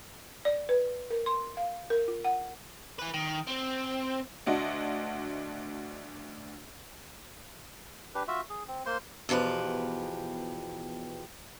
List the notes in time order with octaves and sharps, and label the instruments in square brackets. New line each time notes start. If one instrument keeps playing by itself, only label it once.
[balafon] D5
B4
A#4
C6
F5
A#4
F4
F#5
[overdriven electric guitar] E4 B4
D#3
C4
[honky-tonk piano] D2 D4 F#4 D#5
[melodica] D4 G4 B4
F4 F#4 E5
G#4
C4
A#3 C5 C6
[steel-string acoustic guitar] E2 B2 F3 G4 B4